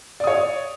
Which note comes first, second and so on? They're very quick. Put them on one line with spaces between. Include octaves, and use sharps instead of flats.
D5 D#6 C#5